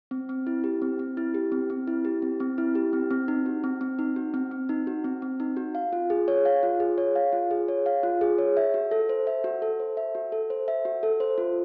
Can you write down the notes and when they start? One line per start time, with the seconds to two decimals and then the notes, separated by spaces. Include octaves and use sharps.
0.11 C4
0.29 C4
0.47 E4
0.64 G4
0.82 C4
0.99 C4
1.17 E4
1.34 G4
1.52 C4
1.70 C4
1.87 E4
2.05 G4
2.22 C4
2.40 C4
2.58 E4
2.75 G4
2.93 C4
3.10 C4
3.28 D#4
3.46 F#4
3.64 C4
3.81 C4
3.99 D#4
4.16 F#4
4.34 C4
4.51 C4
4.69 D#4
4.87 F#4
5.04 C4
5.22 C4
5.40 D#4
5.57 F#4
5.75 F5
5.93 F4
6.10 G#4
6.28 C#5
6.45 F5
6.63 F4
6.80 G#4
6.98 C#5
7.16 F5
7.33 F4
7.51 G#4
7.68 C#5
7.86 F5
8.03 F4
8.21 G#4
8.38 C#5
8.57 E5
8.74 F#4
8.91 A4
9.09 C5
9.27 E5
9.44 F#4
9.62 A4
9.80 C5
9.97 E5
10.15 F#4
10.32 A4
10.50 C5
10.68 E5
10.85 F#4
11.03 A4
11.20 C5
11.38 F4